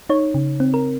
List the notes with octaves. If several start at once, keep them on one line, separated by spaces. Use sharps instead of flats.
D#4 C#5
C#3
C4
A#4